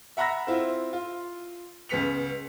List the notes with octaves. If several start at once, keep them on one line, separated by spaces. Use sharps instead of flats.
E5 F#5 A#5 B5 E6 A#6
C4 E4 F4
F4
C#2 C#3 B3 B6 C#7 F7